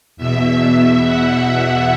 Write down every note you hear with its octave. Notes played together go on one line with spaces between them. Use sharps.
E2 B2 E5
F#5